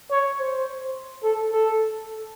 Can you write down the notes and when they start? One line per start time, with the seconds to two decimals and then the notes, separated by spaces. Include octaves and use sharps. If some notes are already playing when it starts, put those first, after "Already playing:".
0.11 C#5
0.39 C5
1.23 A4
1.52 A4